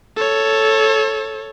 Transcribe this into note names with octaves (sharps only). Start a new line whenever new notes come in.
A4 C#5